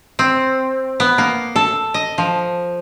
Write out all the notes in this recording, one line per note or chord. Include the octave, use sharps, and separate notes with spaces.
C4
B3
A#3
A4
D#5
F3